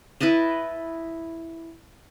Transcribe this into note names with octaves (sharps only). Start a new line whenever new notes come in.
E4 B4 D#5 A5